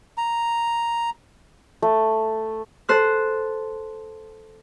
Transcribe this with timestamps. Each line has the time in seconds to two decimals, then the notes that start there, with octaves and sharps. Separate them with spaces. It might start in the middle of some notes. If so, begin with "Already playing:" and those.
0.18 A#5
1.82 A3
2.89 A4 C5 F#6